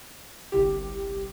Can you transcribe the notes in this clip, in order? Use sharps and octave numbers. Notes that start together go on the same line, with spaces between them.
G1 C2 G4